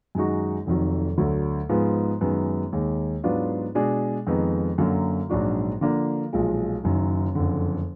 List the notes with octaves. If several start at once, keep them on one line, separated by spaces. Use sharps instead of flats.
F#2 D#3 G#3 D#4 F#4
F1 F2 D#3 F#3
D2 D3 F#3
G#2 F3 G#3 B3
F#2 D#3 G#3 B3
D#2 D#3 G#3
G#2 F#3 B3 D4 F4
B2 G#3 D4 G#4
F2 D#3 G#3 B3 D#4
F#2 D3 F#3 A#3
A#1 G#2 F#3 D4 F#4
D3 F3 A#3 D4
B1 A#2 F3 G#3
F#1 F#2 D#3
F#1 F2 D3